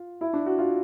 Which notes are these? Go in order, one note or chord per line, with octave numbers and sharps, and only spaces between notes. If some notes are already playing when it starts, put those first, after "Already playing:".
Already playing: F4
E4
D4
F#4
F4